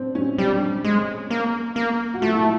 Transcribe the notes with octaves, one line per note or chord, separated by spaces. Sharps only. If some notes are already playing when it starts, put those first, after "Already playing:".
Already playing: C4 D4
C#4
G3 D4
G#3
A#3
A#3
F#4
A3 F4
E4